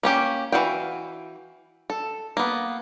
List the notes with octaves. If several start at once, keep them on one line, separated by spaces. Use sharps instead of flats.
A#3 C#4 G4
E3 F#3 F#4 F5 G5
A4
A#3 B3